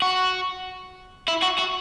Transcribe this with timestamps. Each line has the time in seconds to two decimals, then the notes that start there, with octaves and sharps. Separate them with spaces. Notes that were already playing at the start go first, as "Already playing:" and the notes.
0.02 F#4
1.28 E4
1.43 F#4
1.59 F#4